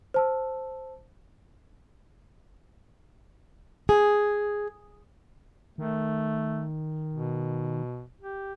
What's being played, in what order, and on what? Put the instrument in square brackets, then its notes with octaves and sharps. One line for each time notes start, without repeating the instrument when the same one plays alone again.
[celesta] C5 A5 E6
[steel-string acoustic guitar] G#4
[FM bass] D#3 [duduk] A3
[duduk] B2
G4